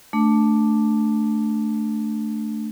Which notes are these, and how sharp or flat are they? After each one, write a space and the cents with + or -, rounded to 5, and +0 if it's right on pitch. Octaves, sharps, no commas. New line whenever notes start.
A3 +0 D4 +0